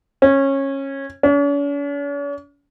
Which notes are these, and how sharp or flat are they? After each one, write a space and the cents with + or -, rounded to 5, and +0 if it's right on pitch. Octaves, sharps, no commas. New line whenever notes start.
C#4 -20
C#4 +45